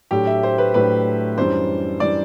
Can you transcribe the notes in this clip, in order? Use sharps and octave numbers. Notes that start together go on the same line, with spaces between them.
A2 F#3 A3 D4 G4
E5
C5
B4
A2 F#3 A3 D4 B4
F#2 E3 G3 D4 C5
E3 G3 D4 D5